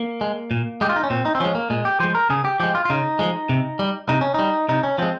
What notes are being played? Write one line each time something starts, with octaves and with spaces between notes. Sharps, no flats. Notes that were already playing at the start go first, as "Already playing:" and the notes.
Already playing: A#3
G#3
A#2
G#3 G4
F4
D#4
C#4
A#2 C4
D#4
C4
F3 G#3 C#4
A#3
A#2 G#3
G4
F3 G#3 C5
A#4
C#3 G#4
G4
F3 G#3 G4
F4
F4
C#3 D#4
F3 G#3
C3
G3
C3 D#4
C#4
G3 D#4
C3 D#4
C#4
F3 G#3 C4